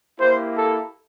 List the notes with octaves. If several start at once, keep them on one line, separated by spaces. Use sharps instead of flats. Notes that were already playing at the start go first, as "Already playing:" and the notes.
A#3 E4 G4 C5
A4